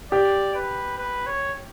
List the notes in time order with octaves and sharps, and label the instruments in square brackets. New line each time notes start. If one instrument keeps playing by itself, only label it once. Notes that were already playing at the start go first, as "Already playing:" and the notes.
[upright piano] G4 [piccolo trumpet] D5
[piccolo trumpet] B4
B4
C#5